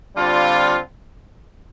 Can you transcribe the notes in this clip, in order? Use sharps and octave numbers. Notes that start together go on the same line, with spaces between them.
D3 G3 C4 F4